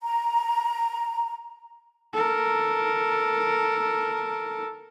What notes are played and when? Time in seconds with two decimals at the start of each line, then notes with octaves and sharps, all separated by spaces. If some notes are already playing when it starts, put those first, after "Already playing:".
0.02 A#5
2.13 A4 A#4